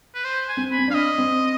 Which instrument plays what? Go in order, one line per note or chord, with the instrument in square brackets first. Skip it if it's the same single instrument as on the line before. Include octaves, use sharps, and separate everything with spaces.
[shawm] B4
C5
G#5
[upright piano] C4
[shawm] B5
[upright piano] C4
[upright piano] D4 [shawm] F5
[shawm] D#5
[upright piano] C4